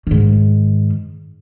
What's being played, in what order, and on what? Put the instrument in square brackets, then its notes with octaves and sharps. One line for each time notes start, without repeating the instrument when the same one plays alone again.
[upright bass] G#2 D#3